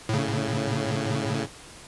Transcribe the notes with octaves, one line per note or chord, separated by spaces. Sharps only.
A2 C#3